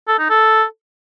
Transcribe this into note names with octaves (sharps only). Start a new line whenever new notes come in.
A4
D#4
A4